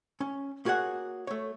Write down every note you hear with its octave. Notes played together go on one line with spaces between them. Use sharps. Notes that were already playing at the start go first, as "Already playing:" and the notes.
C#4
A#3 F#4 G#4 C#5 F#5
A3 C#5